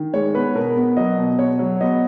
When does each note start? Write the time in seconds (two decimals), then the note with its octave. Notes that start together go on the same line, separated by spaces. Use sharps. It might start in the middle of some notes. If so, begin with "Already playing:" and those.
Already playing: D#3
0.13 G#3 C#5
0.34 B3 B4
0.55 B2 A#4
0.76 B3
0.97 F#3 D#5
1.18 B2
1.39 B2 C#5
1.59 F#3
1.81 B3 D#5